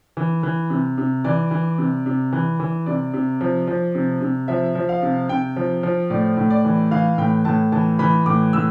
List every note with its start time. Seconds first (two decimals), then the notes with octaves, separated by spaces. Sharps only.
0.17 E3
0.43 E3
0.70 C3
0.98 C3
1.24 E3 D5
1.51 E3
1.78 C3
2.06 C3
2.33 E3
2.60 E3
2.86 C3 D5
3.13 C3
3.41 F3
3.68 F3
3.95 C3
4.21 C3
4.48 F3 E5
4.75 F3
4.89 F5
5.02 C3
5.29 C3 G5
5.56 F3
5.83 F3
6.10 A2 D5
6.37 A2
6.50 D5
6.65 E3
6.91 E3 F5
7.18 A2 G5
7.45 A2 A5
7.72 E3 A5
7.99 E3 B5
8.26 A2 D6
8.53 A2 E6